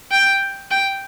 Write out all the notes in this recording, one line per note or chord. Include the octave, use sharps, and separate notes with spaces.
G5
G5